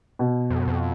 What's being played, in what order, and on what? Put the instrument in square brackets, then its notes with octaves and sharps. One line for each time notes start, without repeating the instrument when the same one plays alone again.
[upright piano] B2
[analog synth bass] F2
F#2
F2